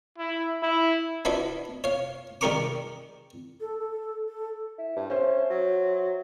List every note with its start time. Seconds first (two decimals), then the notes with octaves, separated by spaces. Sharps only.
0.18 E4
0.63 E4
1.25 D4 E4 F#4 B4 D#5 E5
1.84 C#5 F5
2.41 D#3 G3 G#4 A#4 C#6 D6
3.61 A4
3.79 A4
4.28 A4
4.78 E4
4.96 G2
5.10 C#4 C5 E5
5.50 F#3